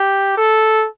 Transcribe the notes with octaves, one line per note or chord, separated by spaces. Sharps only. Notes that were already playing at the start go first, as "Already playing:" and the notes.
Already playing: G4
A4